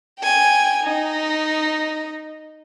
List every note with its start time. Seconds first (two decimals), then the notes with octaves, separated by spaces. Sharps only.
0.20 G5 G#5
0.84 D#4